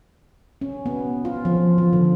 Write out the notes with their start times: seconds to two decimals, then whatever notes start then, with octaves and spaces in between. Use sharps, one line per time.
0.61 C#4
0.86 B3
1.25 F4
1.45 F3
1.78 F3
1.93 D3